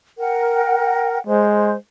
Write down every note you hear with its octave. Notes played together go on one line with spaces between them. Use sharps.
A#4 F#5 G5
G#3 C5